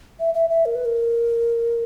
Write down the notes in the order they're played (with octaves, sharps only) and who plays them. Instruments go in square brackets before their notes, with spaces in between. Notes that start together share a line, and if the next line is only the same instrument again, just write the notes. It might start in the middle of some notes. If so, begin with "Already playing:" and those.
[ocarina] E5
E5
E5
A#4
B4
A#4